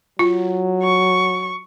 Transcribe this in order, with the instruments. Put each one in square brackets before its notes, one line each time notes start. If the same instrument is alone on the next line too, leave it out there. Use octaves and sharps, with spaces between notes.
[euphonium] F#3 [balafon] F4
[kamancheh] C#6